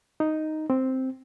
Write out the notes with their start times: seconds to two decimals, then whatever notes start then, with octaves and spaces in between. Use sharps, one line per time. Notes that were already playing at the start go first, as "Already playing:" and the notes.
0.20 D#4
0.70 C4